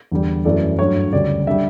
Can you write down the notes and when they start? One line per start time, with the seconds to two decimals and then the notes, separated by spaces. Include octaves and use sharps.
0.12 E2 D3 G3
0.45 F#2 E3 A3 D5
0.79 G2 F#3 A3 C#5
1.13 D2 C#3 G3 D5
1.47 D3 G3 E5